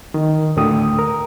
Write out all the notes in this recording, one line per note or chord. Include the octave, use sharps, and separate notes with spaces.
D#3
D2 A2 D3 A3 G5 D#6
A#4